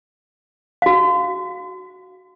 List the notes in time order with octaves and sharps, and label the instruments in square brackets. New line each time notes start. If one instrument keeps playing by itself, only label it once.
[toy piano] F#4 F5